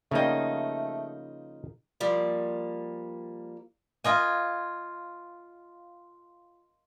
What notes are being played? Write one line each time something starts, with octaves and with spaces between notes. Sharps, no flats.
C#3 F3 A3 A#3 D#4 G5
F3 G3 A#3
F4 D#5 G#5